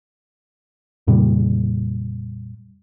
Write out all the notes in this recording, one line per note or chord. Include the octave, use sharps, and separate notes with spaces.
F2 A#2 C#3 G3